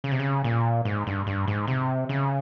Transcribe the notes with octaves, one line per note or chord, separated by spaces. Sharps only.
C#3
C3
C#3
A#2
G#2
G2
G2
G#2
C3
C#3